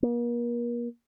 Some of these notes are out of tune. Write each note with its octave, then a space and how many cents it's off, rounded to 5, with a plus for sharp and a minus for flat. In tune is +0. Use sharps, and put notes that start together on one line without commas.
A#3 +40